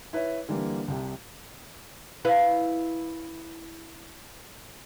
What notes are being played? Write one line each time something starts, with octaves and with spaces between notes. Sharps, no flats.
E4 B4 C#5 E5
D3 E3 G3 A#3
C2 C3 G4
E4 B4 F5